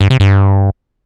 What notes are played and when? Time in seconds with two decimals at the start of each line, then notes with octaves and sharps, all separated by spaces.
0.01 G2
0.10 C3
0.20 G2